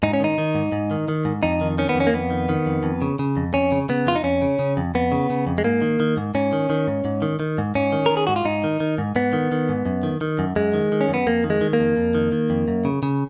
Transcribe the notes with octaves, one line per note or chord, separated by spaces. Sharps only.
G#2 D#4
C#4
D#3 D#4
D#3
G#2
G#2
D#3
D#3
G#2
F2 D#4
D#3
D#3 C#4
B3
F2
C#4
A#3
F2 B3
D#3
D#3
F2
F2
C#3
C#3
F2
F2 C#4
C#3
C#3 B3
F2 F4
D#4
F2 C#4
C#3
C#3
F2
F2 B3
C#3
C#3
F2
G#3
G#2 A#3
D#3
D#3
G#2
G#2 C#4
D#3
D#3
G#2
G#2
D#3
D#3
G#2
G#2 C#4
D#3
D#3 A#4
G#4
G#2 F#4
F4
G#2 D#4
D#3
D#3
G#2
G#2 B3
D#3
D#3
G#2
F#2
D#3
D#3
F#2
F#2 G#3
D#3
D#3
C#4
F#2
B3
F2 A#3
D#3
G#3
D#3
A#3
F2
F2
D#3
D#3
F2
F#2
C#3
C#3